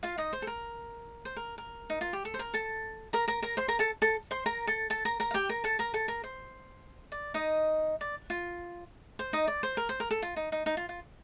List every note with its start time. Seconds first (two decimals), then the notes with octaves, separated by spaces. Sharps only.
0.03 F4 F5
0.18 D#4 D#5
0.33 C5
0.42 A4
0.47 A#4
1.25 C5
1.37 A#4
1.58 A#4
1.90 D#4
2.01 F4
2.13 G4
2.25 A4
2.34 C5
2.39 A#4
2.54 A4 A5
3.13 A#4 A#5
3.28 A#4 A#5
3.42 A#4 A#5
3.57 C5 C6
3.68 A#4 A#5
3.79 A4 A5
4.02 A4 A5
4.31 C5 C6
4.46 A#4 A#5
4.67 A4 A5
4.90 A4 A5
5.05 A#4 A#5
5.20 A#4 A#5
5.31 F5
5.34 G4 G5
5.49 A#4 A#5
5.64 A4 A5
5.79 A#4 A#5
5.94 A4 A5
6.08 A#4
6.24 C5
7.12 D5
7.34 D#4 D#5
8.01 D5
8.30 F4
9.19 C5
9.33 D#4 D#5
9.48 D5
9.63 C5
9.77 A#4
9.89 C5
10.00 A#4
10.11 A4
10.22 F4
10.36 D#4
10.52 D#4
10.66 D#4
10.77 F4
10.89 F4